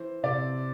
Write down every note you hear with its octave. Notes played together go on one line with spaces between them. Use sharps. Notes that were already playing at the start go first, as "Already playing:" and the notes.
Already playing: E3 C5
C3 D5